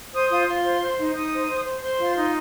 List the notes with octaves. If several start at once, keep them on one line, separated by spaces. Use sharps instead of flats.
C5 D#6
F4 D#6
F4 C6
C5
C5
D#4
D#4 D#6
C5
C5
C5
C5 C6
F4
D#4